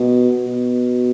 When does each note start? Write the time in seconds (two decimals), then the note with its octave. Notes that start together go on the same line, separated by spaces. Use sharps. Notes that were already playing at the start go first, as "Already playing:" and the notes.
Already playing: B2
0.47 B2